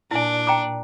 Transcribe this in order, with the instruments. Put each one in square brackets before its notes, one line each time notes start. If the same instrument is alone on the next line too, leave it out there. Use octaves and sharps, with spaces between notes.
[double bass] A#2 [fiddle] D4 [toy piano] E4 G#5
[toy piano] G5 A#5 D6